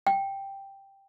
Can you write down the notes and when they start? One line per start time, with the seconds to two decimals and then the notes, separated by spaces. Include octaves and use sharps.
0.07 G5